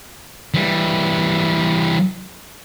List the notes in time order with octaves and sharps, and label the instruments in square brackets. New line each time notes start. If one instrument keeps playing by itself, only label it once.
[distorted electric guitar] E3 G3